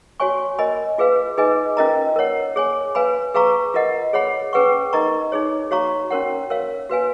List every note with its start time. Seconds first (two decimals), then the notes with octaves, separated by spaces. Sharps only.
0.20 F#4 C#5 G#5 C#6
0.59 A#4 D#5 G#5 B5
0.98 F4 G#4 B4 F5
1.37 D#4 G#4 B4 D#5 G#5
1.77 C#4 F4 A#4 D#5 A#5
2.16 A#4 C#5 F#5
2.56 G#4 C#5 G#5
2.95 B4 F5 G#5 B5
3.34 G#4 B4 F5 A#5 C#6
3.74 F4 A#4 D#5 F#5
4.13 G#4 C#5 F#5 B5
4.53 C#4 G#4 B4 F#5 C#6
4.93 D#4 A#4 D#5 A#5 C#6
5.32 D#4 G#4 C#5
5.71 F#4 C#5 F5 A#5 C#6
6.10 C#4 F#4 A#4 C#5 F#5
6.50 A#4 C#5 F5
6.90 F#4 B4 F5 G#5